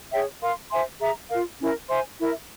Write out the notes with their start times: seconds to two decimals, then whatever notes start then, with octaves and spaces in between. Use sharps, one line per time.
0.11 G#4 C#5 E5 G5
0.40 A#4 F5 C6
0.70 C5 E5 G#5 C6
1.00 G#4 E5 A#5
1.30 F4 A#4 F5
1.59 C#4 E4 A#4
1.89 C5 E5 G#5 C6
2.19 E4 A#4 E5